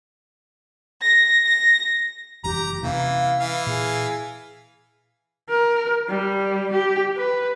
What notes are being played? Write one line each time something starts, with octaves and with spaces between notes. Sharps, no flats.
A#6
A#6
F#1 E2 G4 A#5
C3 E3 A#3 C#4 F5
E3 F5
A#2 G#4
A#4
G3
G4
B4